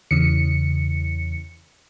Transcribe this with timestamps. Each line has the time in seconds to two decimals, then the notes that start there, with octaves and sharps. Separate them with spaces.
0.11 E2 C#3 C#7